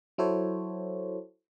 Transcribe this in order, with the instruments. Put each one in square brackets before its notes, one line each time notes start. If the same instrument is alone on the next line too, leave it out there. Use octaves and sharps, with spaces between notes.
[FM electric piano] F#3 E4 F#4 A4 C5 C#5